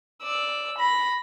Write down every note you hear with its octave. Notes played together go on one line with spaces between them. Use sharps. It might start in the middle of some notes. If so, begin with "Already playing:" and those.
D5 E6
B5 A#6